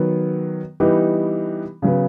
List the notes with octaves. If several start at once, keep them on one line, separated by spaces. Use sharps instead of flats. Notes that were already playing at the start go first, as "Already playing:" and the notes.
Already playing: D#3 F#3 B3
E3 G3 B3 D#4 G4
C#3 F#3 B3